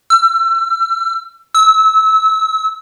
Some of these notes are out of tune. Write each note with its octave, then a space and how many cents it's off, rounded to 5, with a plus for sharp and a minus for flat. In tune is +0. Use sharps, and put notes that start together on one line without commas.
E6 +35
E6 -25